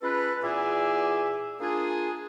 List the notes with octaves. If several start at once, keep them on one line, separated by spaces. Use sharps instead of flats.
G#3 C#4 F4 A4 B4
E2 A#2 G#4 E5 G#5 D6
A#3 D4 F4 G#4